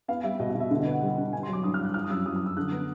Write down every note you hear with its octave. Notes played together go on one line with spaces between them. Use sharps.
B3 F5
G3 E5
B2 D#5
D#5
B2
E5
D3
D#5
B3
F#5
G3
D3
G2 G#5
C6
F#3 D6
G2 D#6
F6
G2
F#6
F3 F6
D#6
F#2 E6
F#2 D#6
D#6
F#2 E6
D3 F#6
B3